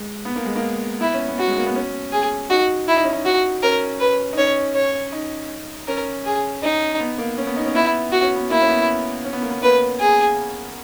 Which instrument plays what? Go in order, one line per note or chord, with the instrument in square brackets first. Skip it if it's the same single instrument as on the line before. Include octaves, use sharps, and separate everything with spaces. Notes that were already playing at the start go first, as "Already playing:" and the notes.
Already playing: [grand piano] G#3
B3
A#3
G#3
A#3
[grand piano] B3 [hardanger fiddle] E4
[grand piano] C#4
B3
[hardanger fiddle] F#4
[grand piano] G#3
A#3
B3
C#4
[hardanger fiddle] G#4
[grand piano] D#4 [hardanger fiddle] F#4
[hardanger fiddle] E4
[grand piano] D#4
C#4
D#4
[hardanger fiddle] F#4
[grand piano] C#4 [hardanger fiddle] A#4
[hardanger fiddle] B4
[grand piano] D#4
[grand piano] C#4 [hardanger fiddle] C#5
[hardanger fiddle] C#5
[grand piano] D#4
[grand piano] C#4 [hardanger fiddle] A#4
[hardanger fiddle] G#4
D#4
[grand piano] B3
A#3
C#4
B3
D#4
C#4
[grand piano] B3 [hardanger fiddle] E4
[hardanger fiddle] F#4
[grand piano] C#4
B3
[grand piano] A#3 [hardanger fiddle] E4
[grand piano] C#4
B3
C#4
B3
A#3
B3
[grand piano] A#3 [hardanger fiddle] B4
[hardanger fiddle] G#4